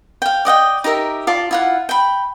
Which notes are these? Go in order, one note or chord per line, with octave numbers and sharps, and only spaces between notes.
F5 G5
D5 D#5 F#5 G5
D#4 G4 A#4 E5
F4 D5 A5
E4 F4 F#5
G5 B5